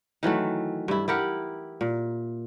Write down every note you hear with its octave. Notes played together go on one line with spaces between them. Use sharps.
D#3 E3 F#3 A3
G2 E4
E4 G4 A#4 F#5
A#2